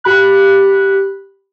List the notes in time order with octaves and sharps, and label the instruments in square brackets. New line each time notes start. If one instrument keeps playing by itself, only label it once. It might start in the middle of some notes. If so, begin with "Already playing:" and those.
[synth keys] G4 B5 F#6